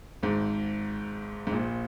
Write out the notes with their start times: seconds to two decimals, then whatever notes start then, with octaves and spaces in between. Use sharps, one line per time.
0.23 G#1 G#2
1.47 G#2
1.52 A#1 A#2